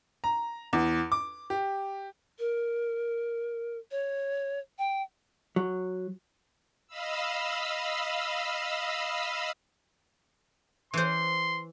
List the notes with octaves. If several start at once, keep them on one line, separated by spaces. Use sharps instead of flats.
A#5
E2
D6
G4
A#4
C#5
G5
F#3
D#5 F5 B5 E6
E3 C5 C6